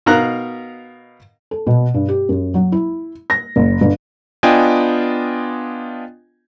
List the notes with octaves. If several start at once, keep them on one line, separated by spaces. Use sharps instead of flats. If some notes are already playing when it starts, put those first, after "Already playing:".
B2 D#4 A#4 F5 A#5 F#6
A4
B2
G2
G4
F#2
F#3
E4
A#6
F#1
G1
B3 D4 F4 D#5 G5 G#5